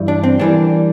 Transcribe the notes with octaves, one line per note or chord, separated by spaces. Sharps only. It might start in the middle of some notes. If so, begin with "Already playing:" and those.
Already playing: G2 E3 G3
D4
C4
E3 G3 A#3 D4